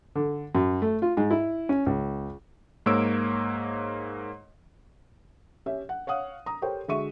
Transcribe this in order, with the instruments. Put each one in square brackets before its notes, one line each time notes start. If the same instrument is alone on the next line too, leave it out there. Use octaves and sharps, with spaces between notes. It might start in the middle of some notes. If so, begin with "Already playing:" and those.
[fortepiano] D3
F#2
A3
F4
G#2
E4
C#4
C#2
[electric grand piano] G#2 A#3 C#5 E6 D7
[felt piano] C#4 G4 E5
F#5
C#5 F5 F#5 D#6
A#5 D#6
G4 A4 A#4 C5 C#5 G5
D3 G#3 F#4 E5 C#6 D#7